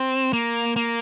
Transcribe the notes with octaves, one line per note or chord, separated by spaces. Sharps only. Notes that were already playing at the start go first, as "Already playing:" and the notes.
Already playing: C4
A#3
A#3